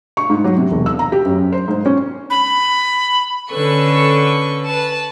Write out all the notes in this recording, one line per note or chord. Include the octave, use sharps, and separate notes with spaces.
C#6
G#2
F#3
C3
E1
E6
A#5
G4
F#2
C5
G#2
C#4
B5
D3 C#4 A4 B4 C#6
B4 A5